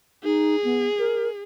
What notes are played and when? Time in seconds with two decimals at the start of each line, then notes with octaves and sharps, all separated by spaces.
0.24 D#4 G#4
0.64 B3
0.99 A#4